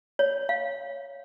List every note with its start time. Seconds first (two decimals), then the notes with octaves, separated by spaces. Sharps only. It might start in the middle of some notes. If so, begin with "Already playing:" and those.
0.19 C#5
0.49 F5